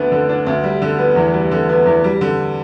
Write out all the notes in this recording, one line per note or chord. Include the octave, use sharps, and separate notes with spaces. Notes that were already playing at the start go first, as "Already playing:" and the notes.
Already playing: D2 D3 B3 D4
D3
D4
D2
G3
D3
B3
E2
G3
D3
B3
E2
G3
D3